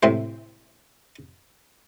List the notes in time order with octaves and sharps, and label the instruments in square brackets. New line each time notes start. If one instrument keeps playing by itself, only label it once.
[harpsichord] A2 C3 C5